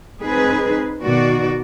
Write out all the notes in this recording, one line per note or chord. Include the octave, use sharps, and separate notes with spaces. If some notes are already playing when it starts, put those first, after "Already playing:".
C4 D#4 G#4 B4
B2 D#3 F#4 D5